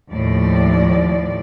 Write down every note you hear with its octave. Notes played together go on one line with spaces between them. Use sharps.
D#2 A2 F3 D5